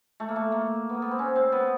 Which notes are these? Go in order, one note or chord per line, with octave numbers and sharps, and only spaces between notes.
A3
A#3
A3
A#3
B3
A#3
B3
C4
C#4
C4
B3